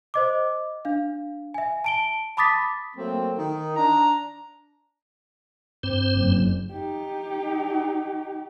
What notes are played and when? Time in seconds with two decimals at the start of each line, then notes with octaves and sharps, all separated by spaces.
0.14 C5 D#5 D6
0.85 D4 F5
1.54 E5 G#5
1.84 A5 D7 G7
2.37 A5 B5 D6 D#6 A6 B6
2.96 F#3 A3 A#3 C4
3.38 D#3 D#4
3.77 D4 A#5
5.83 G2 C4 C5
6.15 F#1
6.73 D#4 G4